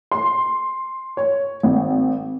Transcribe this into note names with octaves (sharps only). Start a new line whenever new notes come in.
C6
C#5
G#1